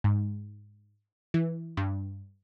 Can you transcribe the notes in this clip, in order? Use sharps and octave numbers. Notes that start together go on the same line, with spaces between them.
G#2
E3
G2